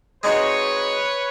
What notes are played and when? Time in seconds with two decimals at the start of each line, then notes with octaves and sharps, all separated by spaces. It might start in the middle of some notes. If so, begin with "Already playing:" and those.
0.23 G#3 C4 D#4 F#4 B4 C#5